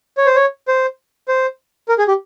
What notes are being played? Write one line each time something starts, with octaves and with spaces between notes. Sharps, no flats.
C#5
C5
C#5
C5
C5
A#4
G#4
G4